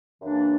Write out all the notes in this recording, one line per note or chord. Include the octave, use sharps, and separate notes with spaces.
F#2 C#3 E3 A#3 D4